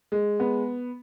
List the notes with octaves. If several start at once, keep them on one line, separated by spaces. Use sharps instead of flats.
G#3
B3